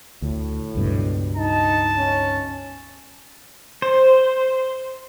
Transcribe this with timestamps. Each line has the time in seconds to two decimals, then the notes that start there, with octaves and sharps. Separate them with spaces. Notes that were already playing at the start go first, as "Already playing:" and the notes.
0.22 D2 A2
0.75 C#2 G2 B2
1.37 D#4 A5
1.97 C#4
3.82 C5